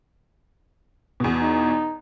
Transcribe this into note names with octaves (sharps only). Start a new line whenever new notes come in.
E2 B2
D#4